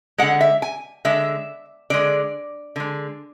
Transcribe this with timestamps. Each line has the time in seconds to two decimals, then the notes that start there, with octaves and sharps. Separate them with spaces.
0.18 D3 G#3 F#5
0.41 E5
0.62 G#5
1.05 D3 G#3 E5
1.90 D3 G#3 D5
2.76 D3 G#3